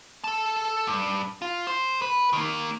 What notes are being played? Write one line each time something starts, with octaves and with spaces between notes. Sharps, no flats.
A4 A5
G2
F4
C5
B4
D#3 A#3